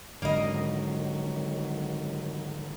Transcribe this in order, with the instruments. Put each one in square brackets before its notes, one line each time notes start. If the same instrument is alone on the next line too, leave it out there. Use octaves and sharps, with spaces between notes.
[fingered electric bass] G#1 G#2 D3 [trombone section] F2 D#3 F#3 [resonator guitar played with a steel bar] A#3 D#5